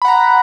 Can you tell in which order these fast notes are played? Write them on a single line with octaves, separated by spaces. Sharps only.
B5 F#5 A#5